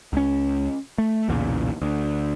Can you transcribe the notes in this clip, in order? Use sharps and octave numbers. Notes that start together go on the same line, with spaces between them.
C#2 C#4
A3
B1 E2 A#2 C#3
D2